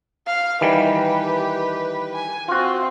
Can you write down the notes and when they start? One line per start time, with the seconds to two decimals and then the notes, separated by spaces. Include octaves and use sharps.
0.27 F5
0.61 D#3 E3 G3 G4 B4
2.15 G#5
2.48 C4 F4 F#4